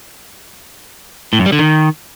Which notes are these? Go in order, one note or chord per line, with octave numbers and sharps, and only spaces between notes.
A2
F#2
G3
D3
D#3